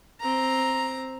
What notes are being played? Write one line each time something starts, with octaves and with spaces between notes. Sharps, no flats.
C4 A#5